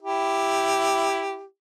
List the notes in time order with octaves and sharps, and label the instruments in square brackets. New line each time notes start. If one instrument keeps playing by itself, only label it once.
[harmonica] E4 G4